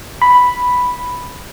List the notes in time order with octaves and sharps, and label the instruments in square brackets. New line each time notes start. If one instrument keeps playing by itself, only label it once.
[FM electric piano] B5